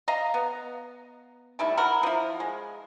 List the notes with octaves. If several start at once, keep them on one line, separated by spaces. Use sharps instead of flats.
D#5 F5 A#5
B3
D#3 G3 A3 E4
F#3 F#4 A#4 B5
F3 E4
G#3